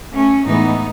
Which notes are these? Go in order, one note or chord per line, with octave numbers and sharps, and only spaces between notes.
A3 C#4
A2 E3 G#3 B3 D#4